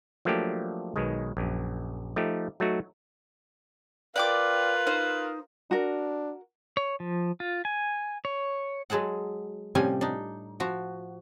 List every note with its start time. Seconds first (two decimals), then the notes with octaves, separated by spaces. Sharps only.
0.25 F3 F#3 A3 A#3 D4 G4
0.96 B1 B2 D#3 G#3
1.37 A#1 F#2
2.16 F3 A3 D#4 G4
2.60 F#3 A3 D#4 F#4
4.16 F4 A#4 B4 D5 G5 D6
4.87 D#4 C5
5.71 D4 F#4 A#4
6.77 C#5
7.00 F3
7.40 F4
7.65 G#5
8.25 C#5
8.90 F#3 G#3 G#4 A4 F#5
9.75 A2 C3 F3 G3 C#4 G#5
10.01 D4 D#4
10.60 F3 F#4